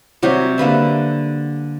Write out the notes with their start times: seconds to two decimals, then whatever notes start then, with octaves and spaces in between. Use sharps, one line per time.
0.23 C3 F#3 G3 G4
0.58 D3 A#3 B4 E5